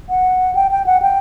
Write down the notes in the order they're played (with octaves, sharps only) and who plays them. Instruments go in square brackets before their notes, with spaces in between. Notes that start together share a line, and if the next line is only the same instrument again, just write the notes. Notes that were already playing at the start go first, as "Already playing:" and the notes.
[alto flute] F#5
G5
G5
F#5
G5